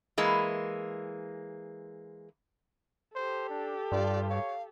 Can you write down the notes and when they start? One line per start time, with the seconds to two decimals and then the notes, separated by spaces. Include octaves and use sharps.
0.18 E3 G#3 A#3
3.15 G4 A4 C5
3.50 D4
3.92 G2 F4 D5
4.30 C#5 F5